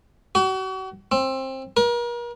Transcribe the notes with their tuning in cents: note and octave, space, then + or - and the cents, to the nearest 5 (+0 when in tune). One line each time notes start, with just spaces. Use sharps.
F#4 +40
C4 +20
A#4 +40